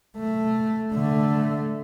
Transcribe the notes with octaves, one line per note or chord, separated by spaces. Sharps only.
A3
D3 A3